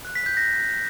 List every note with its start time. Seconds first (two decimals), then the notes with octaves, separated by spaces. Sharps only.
0.05 F#6
0.15 B6
0.26 G6
0.37 A#6